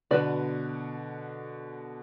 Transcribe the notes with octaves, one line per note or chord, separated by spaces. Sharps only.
B2 D3 B3 F#4 B4 D5